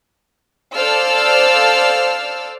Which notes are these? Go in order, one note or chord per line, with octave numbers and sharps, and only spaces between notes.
A4 C5 D5 F5 E6 F6